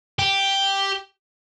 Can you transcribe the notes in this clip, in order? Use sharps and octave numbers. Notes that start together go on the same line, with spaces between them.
G4